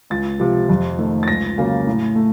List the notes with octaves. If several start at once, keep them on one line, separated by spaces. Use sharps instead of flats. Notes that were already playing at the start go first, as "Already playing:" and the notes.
C#2 A6
C3 F3
F2
D#3 A3
A6
C#2 A#6
C#3 F#3 A#3
A2
A3